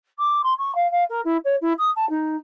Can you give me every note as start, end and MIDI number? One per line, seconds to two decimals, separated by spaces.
0.18 0.41 86
0.43 0.53 84
0.58 0.74 85
0.75 0.90 77
0.91 1.04 77
1.09 1.20 70
1.24 1.37 64
1.44 1.56 73
1.61 1.73 64
1.78 1.90 87
1.96 2.08 81
2.09 2.36 63